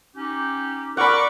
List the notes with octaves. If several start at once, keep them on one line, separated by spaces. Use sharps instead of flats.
C#4 D#4 G4
A#4 D5 F#5 B5 C#6 D6